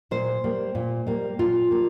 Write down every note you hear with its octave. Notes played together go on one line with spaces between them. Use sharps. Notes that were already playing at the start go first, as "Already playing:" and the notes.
A#2 C5
G3 A#3
A#2
G3 A#3
A#2 F4
G3 A#3